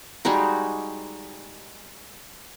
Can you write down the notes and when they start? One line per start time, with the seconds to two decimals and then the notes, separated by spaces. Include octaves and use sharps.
0.25 G3 G#3 D#4 F#4